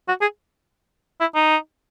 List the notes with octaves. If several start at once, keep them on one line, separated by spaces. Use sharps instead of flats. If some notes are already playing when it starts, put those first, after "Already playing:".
F#4
G#4
E4
D#4